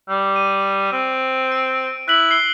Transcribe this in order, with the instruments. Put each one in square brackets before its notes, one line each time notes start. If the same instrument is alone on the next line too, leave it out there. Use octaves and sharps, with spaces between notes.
[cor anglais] G3
[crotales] D#7
[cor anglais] C4
[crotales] D7
[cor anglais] E4 [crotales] F#6 B6 F#7
[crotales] C7 G7